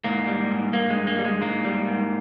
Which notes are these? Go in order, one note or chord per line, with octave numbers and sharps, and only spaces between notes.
G#2 A#3
G3
G#2
G2 A#3
G#3
G2
A#3
G3
G#3
G#2 A#3
G3
G#2